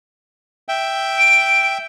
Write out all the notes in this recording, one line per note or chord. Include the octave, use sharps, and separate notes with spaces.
E5 G5
D7